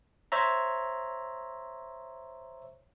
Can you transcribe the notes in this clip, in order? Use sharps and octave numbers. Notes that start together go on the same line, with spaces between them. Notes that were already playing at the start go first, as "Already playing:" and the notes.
C5 C#5 E5 A#5